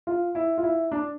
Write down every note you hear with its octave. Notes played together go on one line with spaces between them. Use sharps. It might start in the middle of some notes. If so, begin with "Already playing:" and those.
F4
E4
F4
E4
D4